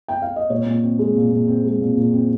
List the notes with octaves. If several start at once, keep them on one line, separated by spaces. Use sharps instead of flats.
G5
F5
D#5
A#2 C#5
A#2
C4
G#3
A#2
A#2
C4
G#3
A#2
A#2
C4